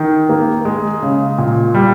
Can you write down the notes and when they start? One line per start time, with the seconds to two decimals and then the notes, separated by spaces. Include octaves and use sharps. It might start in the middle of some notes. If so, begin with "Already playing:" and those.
Already playing: D#3
0.29 A#3
0.65 G#3
1.03 C#3
1.38 A#2
1.75 G3